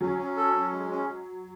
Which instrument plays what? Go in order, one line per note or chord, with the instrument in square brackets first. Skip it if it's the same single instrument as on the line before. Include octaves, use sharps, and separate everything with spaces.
[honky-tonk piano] F#3 [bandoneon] C#4
[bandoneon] C#4
A4
C#4
G#3
C#4